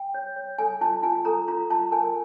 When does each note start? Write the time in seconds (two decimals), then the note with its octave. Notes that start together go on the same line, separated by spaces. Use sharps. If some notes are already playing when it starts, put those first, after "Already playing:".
Already playing: G5
0.14 C#5
0.36 C#5
0.58 A4 G#5
0.81 F4 A5
1.03 F4 G#5
1.25 A4 A#5
1.48 F4 A#5
1.70 F4 A5
1.92 A#4 G#5